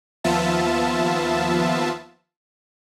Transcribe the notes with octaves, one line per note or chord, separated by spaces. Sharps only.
D#2 F3 B3 F4 E5 A5